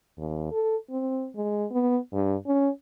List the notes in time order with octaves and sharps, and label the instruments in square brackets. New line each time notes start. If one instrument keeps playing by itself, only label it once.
[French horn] D#2
A4
C4
G#3
B3
G2
C#4